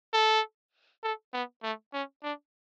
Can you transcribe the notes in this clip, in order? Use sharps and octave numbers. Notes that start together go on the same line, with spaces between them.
A4
A4
B3
A3
C#4
D4